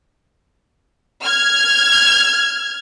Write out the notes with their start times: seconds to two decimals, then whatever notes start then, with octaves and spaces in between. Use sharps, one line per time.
1.24 F6 G#6